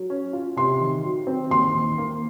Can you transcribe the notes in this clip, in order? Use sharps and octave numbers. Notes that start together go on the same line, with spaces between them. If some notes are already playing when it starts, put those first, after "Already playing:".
Already playing: F#3
C#4
F4
C3 C6
D#3
F#3
C4
D#2 C6
D#3
A#3